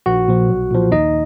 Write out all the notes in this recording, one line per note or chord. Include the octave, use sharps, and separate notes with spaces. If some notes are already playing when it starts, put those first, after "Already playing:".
A#1 F#4 F#5
A#2 F3
B1
A#2 F3
D#2 D#4 D#5